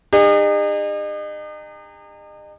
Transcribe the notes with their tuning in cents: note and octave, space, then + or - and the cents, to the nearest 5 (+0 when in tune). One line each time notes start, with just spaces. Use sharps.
D#4 -40 G#4 -45